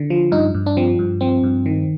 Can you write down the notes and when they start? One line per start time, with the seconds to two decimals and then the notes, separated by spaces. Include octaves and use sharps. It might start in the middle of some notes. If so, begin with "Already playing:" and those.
Already playing: D3
0.10 F3
0.32 G2 D#4
0.55 G2
0.66 D4
0.77 F3 C4
0.99 G2
1.21 F3 C4
1.43 G2
1.66 D#3